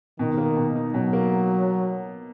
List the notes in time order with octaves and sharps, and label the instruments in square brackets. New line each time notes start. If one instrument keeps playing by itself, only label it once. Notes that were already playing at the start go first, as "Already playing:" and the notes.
[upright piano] B2 [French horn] D#3
[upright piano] A#3
B2
D#4
[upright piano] B2 [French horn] F#3
[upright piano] A#3